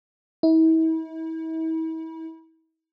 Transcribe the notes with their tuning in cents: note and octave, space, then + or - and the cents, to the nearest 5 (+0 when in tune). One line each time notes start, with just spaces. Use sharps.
E4 -40